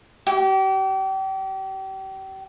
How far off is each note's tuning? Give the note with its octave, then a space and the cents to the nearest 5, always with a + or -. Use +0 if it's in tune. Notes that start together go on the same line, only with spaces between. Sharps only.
G4 -35